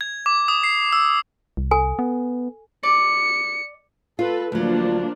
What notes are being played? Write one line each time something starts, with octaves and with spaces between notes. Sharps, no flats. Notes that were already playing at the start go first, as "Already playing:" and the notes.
G#6
D6
D#6
C7
E6
C2
A4 G#5
B3
D5 C#7
F4 A4 B4
D2 F3 F#3 A#3 D4